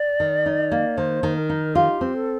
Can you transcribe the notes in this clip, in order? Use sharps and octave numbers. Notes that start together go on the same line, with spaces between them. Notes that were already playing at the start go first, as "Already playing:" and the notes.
Already playing: D5
D#3
D#4
A#3
D#3 C5
D#3
A#4
D#4
F4 G4
C4
A4